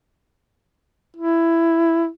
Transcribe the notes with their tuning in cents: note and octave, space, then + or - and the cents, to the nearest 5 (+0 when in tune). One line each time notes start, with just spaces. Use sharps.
E4 +10